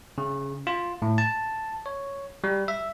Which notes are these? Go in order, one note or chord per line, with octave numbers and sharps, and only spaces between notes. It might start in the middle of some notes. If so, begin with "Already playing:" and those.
C#3
F4
A2
A5
C#5
G3
E5